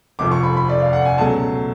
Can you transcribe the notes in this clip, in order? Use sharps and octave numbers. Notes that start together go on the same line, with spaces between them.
F1 F2 F3 D6
C#6
B5
B5
D5
F5
F#5
G#5
C#2 B2 F#3 A3 A5